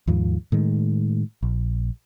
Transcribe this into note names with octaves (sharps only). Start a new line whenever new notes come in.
D#2 G#2 F3
A2 D#3 G#3
A#1